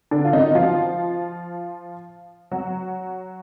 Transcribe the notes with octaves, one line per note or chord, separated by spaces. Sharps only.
D3 D4
F4
D#3 D#4
F3 F4
F#3 F#4